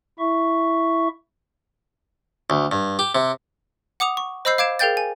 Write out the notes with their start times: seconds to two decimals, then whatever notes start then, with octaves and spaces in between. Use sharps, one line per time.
0.19 E4 E5 C#6
2.50 D2
2.72 G2
2.99 G4
3.15 C3
4.00 F#5 D6 D#6 F7
4.17 C#6
4.45 C5 D#5 B5 E6 G6 C7
4.58 F5 D6 G#6 D7 E7
4.79 G#4 A#4 F5 G5 G6 A6
4.97 G#5